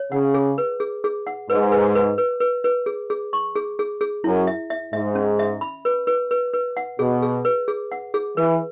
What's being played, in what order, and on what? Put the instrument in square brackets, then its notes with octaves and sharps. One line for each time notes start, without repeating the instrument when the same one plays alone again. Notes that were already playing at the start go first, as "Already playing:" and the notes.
Already playing: [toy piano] C#5
[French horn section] C#3 [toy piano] F#5
[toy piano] G#4
B4
G#4
G#4
F#5
[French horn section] G#2 [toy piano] B4
[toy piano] B4
B4
B4
B4
B4
G#4
G#4
C#6
G#4
G#4
G#4
[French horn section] F#2 [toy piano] E4
[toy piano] E5
E5
[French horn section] G#2 [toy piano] E5
[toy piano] C#4
E5
B5
B4
B4
B4
B4
F#5
[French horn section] B2 [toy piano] G#4
[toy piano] G#4
B4
G#4
F#5
G#4
[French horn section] E3 [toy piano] B4